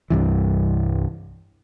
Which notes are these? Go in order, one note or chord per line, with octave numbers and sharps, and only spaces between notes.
C2 G2 E3